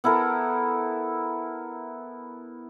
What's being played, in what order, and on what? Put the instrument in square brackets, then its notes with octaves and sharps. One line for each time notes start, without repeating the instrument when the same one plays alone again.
[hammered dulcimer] B3 E4 A4 A#4